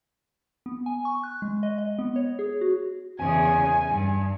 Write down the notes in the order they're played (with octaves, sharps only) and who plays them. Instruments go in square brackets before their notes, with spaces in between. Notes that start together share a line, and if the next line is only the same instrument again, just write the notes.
[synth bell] B3
G#5
C#6
F#6
G#3
D#5
D#5
B3
C#5
G#4
F#4
[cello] E2 C#3 [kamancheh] G#5
[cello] G2